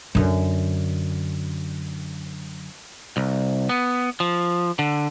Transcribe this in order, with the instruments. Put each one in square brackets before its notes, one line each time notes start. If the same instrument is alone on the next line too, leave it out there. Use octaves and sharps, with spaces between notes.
[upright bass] F#2 D3
[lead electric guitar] C2
B3
F3
D3